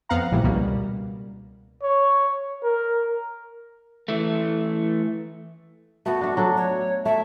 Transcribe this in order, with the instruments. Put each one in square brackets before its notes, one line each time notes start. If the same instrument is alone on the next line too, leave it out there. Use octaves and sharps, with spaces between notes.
[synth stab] F2 B3 F5 F#5 A#5
A#1 A#2 E3 G3
C#2 B2 G3 A#3
[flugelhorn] C#5
A#4
[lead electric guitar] E3 A3
[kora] A3 B3 [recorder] F#4
[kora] A3 D4
F#3 D4 A4
[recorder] C#5
[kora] A3 [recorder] E5